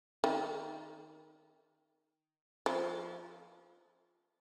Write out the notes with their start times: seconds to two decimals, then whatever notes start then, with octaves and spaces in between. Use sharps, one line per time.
0.24 D#3
2.66 F3